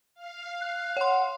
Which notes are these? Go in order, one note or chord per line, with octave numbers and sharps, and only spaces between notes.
F5
F#6
C#5 F#5 C6